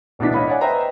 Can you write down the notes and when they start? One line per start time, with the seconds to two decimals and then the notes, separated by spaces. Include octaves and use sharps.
0.19 D1 B2 E3 D4 B6
0.34 C#5 D#5 F5 B5
0.47 C#5 D5 F#5 G#5
0.61 B4 C5 D#5 E5 G5 A#5